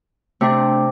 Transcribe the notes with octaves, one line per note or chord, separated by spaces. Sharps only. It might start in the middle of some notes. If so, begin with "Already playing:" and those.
C3 A3 D4